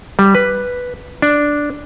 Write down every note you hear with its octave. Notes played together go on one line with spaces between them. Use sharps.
G3
B4
D4